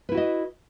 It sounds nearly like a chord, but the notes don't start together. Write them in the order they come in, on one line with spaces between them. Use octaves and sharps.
B4 E4 F#4 D#5